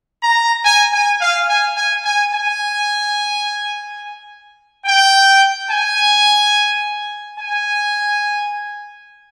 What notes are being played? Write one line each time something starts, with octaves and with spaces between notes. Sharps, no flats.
A#5
G#5
G#5
F5
G#5
G#5
G#5
G#5
G5
G#5
G#5